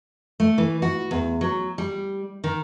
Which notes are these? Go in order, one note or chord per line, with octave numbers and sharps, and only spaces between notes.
A3
E3
F#4
E2
F#3
G3
D#3